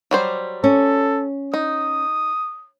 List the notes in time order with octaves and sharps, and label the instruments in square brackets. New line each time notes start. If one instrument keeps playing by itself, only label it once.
[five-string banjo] F#3 G3 C5
[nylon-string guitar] C#4 [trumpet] A4
[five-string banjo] D#4 [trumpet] D#6